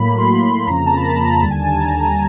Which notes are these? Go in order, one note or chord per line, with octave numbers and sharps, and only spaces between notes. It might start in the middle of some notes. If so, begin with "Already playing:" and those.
Already playing: A2 F#3 A#3 B5
B5
C6
B5
F2 C#3 F3 A#3 A#5
A5
B5
A#5
A#5
D#2 D3 G3 A5
G#5
A5
A#5